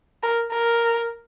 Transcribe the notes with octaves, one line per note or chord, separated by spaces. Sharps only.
A#4
A#4